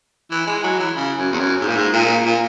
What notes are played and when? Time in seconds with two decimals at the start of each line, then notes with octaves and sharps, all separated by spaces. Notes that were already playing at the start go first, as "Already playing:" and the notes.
0.31 E3
0.47 G#3
0.63 F#3
0.79 E3
0.96 C#3
1.18 F#2
1.32 E2
1.39 F#2
1.61 G#2
1.68 A#2
1.76 G#2
1.93 A#2
2.26 A#2